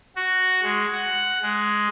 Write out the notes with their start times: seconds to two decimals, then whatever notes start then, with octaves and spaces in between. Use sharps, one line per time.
0.16 F#4
0.63 G#3
0.93 F#5
1.42 G#3